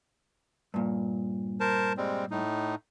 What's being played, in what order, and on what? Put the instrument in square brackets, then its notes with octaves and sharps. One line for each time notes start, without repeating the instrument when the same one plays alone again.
[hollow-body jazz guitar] G2 A#2
[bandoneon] A#4 C5 A5
G3 G#3 C4
A2 D#4